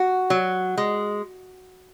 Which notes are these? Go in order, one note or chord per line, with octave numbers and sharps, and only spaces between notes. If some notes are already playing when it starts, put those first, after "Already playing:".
Already playing: F#4
F#3
G#3